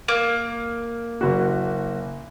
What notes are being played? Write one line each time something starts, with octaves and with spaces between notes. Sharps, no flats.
A#3
F#1 F#4